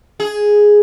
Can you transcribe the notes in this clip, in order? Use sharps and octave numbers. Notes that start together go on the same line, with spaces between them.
G#4